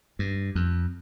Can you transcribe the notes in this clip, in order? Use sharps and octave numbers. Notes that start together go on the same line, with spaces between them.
G2
F2